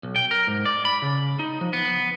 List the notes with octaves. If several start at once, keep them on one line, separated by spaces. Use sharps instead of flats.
B1
G5
A#4
G#2
D5
B5
C#3
D#4
F3
B3